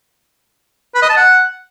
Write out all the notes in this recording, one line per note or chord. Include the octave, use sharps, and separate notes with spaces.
B4
D#5
A5
F#5